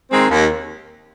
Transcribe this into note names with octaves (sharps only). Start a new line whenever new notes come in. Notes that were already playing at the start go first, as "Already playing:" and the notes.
D#3 G#3 C4
D#2